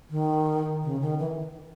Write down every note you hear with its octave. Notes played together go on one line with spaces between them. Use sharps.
D#3
C#3
D#3
E3